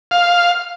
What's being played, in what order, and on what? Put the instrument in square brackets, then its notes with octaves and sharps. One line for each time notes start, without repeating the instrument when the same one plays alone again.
[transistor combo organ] F5